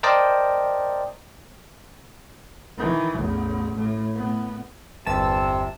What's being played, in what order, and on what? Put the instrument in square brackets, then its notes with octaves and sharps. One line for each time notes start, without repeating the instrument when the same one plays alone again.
[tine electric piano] A#4 C5 D5 D#5 G5 A5
[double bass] D#3 E3
A1 E2
A2
A2 B3
[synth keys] G1 E2 E6 [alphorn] C3 [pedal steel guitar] A5